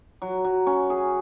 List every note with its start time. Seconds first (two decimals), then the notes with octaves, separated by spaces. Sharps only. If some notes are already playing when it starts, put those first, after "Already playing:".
0.22 F#3
0.44 F#3
0.67 C#4
0.90 G#4